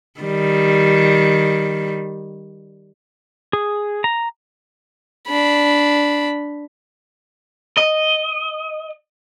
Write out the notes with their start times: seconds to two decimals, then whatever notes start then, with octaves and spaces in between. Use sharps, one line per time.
0.20 D#3 G3
3.53 G#4
4.04 A#5
5.28 D4 B5
7.77 D#5